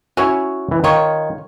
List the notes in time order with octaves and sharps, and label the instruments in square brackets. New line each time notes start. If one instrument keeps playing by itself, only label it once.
[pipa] C#4 E4 [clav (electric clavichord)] F#4 C#5
[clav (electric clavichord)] E3
[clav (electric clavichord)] D#3 [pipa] F4 C#5